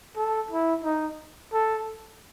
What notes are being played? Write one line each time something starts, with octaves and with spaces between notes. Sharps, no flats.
A4
E4
D#4
A4